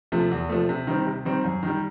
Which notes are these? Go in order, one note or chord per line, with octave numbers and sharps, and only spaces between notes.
C3 F3 A3
E2
C3 F3 A3
C3
D#3 G3 C4
C3
D#3 G3 C4
F#2
D#3 G3